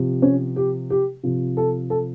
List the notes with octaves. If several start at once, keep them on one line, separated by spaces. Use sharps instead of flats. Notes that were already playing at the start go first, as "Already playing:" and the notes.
Already playing: C3 F3
C#4
G4
G4
C3 F3
A4
A4